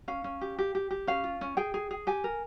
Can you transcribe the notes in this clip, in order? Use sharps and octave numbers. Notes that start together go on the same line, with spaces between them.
C#4 F5
C#4
G4
G4
G4
G4
C#4 F5
F4
C#4
G#4 G5
G#4
G#4
G4 G#5
A#4